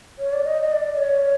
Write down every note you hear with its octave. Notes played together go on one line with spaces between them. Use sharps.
C#5
D5
D#5
D#5
D5
D5
C#5